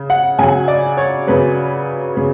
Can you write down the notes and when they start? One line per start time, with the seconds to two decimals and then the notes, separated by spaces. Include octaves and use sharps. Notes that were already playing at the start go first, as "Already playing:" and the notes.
Already playing: C#3
0.10 F#5
0.39 C#3 F#3 G#5
0.68 D5
0.97 C#5
1.27 C#3 F#3 B4
2.17 C#3